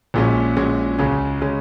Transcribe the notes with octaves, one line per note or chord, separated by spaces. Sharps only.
A#1 A#2 G#3 C#4 F#4
A#1 A#2 G#3 C#4 F#4
C#2 C#3 G#3 C#4
C#3 G#3 C#4